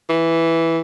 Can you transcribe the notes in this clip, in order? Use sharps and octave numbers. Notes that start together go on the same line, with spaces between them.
E3